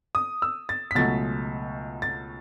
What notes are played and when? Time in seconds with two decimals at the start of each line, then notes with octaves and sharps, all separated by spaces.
0.15 D#6
0.42 E6
0.69 A6
0.91 B6
0.95 C#2 B2 F#3 A3 A6
2.02 A6